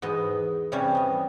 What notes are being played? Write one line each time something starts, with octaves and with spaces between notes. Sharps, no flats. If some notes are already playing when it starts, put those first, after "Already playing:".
E2 G#2 B3 D#5
C3 E3 G3 C#4
B3 D#5